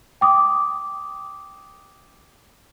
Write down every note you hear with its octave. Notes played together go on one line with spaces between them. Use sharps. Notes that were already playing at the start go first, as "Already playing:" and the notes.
G5 D6 D#6